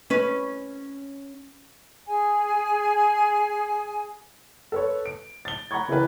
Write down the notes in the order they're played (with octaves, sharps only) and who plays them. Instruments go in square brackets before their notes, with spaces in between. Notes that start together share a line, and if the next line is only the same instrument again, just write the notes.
[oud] C#4 B4
[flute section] G#4 G#5
[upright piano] A4 B4 C#5
D7
A6 G7
F#5 A#5 B5 C#6 G#6
C#3 E3 E4 G4 A#4 B4